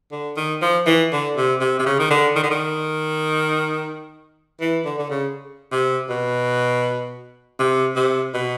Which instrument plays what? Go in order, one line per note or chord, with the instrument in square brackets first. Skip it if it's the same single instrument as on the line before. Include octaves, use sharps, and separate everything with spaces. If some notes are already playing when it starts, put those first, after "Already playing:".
[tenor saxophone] D3
D#3
F3
E3
D3
C3
C3
C3
C#3
D#3
D3
D#3
D3
D#3
E3
D3
D3
C#3
C3
B2
C3
C3
B2